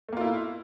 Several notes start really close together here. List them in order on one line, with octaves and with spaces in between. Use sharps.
A3 A#3 F4 E4